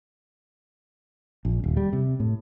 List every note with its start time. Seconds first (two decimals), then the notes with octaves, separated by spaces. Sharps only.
1.45 A#1
1.64 D#1
1.77 G3
1.93 C3
2.20 A2